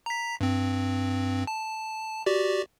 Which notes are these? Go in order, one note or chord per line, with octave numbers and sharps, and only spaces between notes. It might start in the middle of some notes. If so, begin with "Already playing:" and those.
A#5 B6
G2 C4
A5
F#4 G4 D5